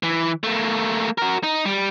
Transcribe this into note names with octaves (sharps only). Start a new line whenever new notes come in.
E3
A3 A#3
F#4 A#4
D#4
G3